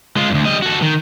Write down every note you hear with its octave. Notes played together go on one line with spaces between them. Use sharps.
G#3 F4
D2 G2
G3 D#5
F#4 A4
D#3